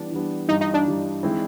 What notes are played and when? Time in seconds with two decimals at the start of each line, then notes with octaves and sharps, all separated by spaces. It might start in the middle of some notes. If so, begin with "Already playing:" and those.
Already playing: E3 G3 B3 D4
0.11 E3 G3 B3
0.48 G2 E3 G3 D#4
0.61 D#4
0.74 D4
0.86 G2 E3 G3
1.23 E3 G#3 C4 E4